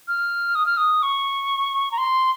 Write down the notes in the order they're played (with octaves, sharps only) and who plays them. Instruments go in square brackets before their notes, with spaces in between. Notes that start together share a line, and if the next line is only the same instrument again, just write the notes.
[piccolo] F6
D#6
F6
D#6
C#6
A#5
C6